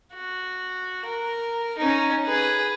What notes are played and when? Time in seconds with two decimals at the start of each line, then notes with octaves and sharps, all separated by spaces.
0.14 F#4
1.06 A#4
1.78 C#4 D#4
2.26 G#4 B4